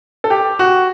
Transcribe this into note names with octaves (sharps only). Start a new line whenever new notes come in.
A4
G4
F#4